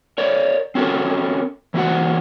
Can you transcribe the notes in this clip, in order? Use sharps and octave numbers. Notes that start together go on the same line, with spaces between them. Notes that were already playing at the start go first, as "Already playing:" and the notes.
A#4 C#5 D5
C4 C#4 F#4 A4 A#4
E3 A#3 C4 F4 F#4 F#5